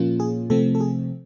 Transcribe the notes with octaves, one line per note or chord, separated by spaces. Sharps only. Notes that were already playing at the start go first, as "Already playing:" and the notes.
Already playing: A#2 F3 A#3 C#4 F4
G#4
C3 F3 A3 C4 A4
A4
G#4